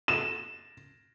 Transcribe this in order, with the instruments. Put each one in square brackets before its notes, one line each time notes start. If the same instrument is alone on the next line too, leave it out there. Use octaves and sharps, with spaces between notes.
[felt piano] E7